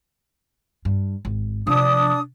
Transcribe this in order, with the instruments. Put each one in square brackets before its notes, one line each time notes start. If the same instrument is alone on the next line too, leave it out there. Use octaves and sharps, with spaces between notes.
[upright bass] G2
G#1
[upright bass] C3 F3 [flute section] D4 D#6